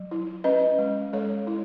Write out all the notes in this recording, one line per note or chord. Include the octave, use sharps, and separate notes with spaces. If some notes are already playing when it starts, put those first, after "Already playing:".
Already playing: F#3
E4
C#4 B4 D#5
G#3
G#3 A4 C#5
E4